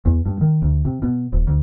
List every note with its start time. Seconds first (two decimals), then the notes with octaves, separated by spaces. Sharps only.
0.05 E2
0.26 G2
0.41 D#3
0.62 D2
0.85 C3
1.02 B2
1.32 D#1
1.47 D2